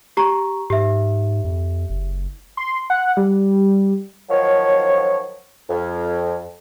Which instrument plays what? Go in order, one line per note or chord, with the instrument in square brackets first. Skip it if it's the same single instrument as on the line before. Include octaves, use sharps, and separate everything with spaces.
[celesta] G4 A#5 C#6
[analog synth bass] G#2 [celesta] G4 E5
[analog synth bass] F2
F#1
[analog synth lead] C6
F#5
G3
[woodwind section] D#3 F3 F#3 C#5
F2